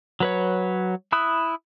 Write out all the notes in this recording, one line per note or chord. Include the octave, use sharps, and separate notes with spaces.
F#3 B4 C#5
E4 B5 D#6 F#6